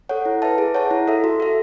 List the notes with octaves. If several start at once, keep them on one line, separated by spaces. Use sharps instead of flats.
A4 C#5 F#5
E4
B4 E5 A5
G#4
C#5 F#5 A5
E4
A4 E5
F#4
A4 E5